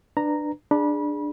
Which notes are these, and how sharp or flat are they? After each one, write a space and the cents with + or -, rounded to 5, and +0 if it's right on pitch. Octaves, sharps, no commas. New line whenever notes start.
D4 +20 B4 +5 A#5 -5
D4 +10 G#4 -5 B5 -30